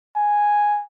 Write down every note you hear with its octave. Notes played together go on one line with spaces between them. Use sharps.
G#5